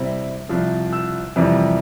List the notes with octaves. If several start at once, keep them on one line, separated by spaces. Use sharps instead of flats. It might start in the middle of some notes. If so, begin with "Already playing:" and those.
Already playing: C3 G3 C4 E4
C2 C3 F3
E6
F2 C3 E3 G3